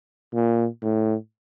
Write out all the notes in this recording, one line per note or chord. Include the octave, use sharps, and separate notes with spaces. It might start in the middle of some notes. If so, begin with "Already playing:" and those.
A#2
A2